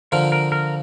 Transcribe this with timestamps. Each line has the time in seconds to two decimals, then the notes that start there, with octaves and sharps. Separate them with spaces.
0.12 D3 F3 A#4
0.32 A#4
0.52 A#4